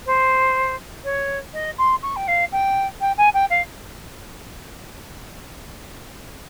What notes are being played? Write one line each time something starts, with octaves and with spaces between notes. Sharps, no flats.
C5
C#5
D#5
C6
C#6
G5
F5
G5
G5
G#5
G5
F5